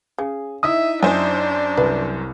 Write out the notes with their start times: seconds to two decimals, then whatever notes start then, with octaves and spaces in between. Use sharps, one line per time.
0.18 C#3 G#4
0.63 D#4 E4 E5 D#6
1.03 F#2 D4 C5 G#5
1.77 C2 B4